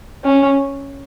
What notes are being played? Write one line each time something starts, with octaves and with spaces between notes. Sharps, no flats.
C#4